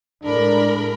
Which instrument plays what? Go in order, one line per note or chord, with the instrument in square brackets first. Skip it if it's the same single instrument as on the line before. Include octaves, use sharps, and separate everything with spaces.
[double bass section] A2 G#3 [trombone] D4 [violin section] A#4 B5